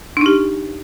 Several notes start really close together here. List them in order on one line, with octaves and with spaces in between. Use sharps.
D4 D#4 G4